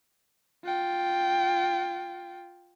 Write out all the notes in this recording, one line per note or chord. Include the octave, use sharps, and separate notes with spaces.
F4 G5